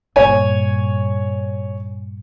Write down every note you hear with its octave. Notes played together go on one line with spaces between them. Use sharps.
G2 A#2 C#5 G#5